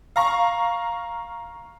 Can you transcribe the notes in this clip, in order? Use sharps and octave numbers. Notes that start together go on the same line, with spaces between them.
F5 A#5 C#6